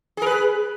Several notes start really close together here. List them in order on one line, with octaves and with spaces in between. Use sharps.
G#4 A#4 B4